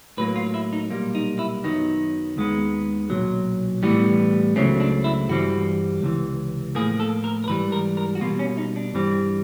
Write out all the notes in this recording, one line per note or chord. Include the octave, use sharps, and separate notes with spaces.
A2 F#3 A#3 B4
F4
E4
D#4
B1 A#2 G3 A#3
D#4
E4
F#2 D#3 F#3 B3 D#4
D#2 D#3 G#3 B3
B1 A#2 F#3
A2 E3 G3 B3
C#2 C#3 F#3 A3 C4 C#4
D4
E4
G2 E3 G3 C4 F#4
C#2 C3 E3
A2 F3 A#3 G#4
A4
A#4
A#4
G#2 E3 G3 B4
A#4
A#4
F#4
B2 G3 A#3 F4
C#4
D#4
D4
G2 E3 G3 C4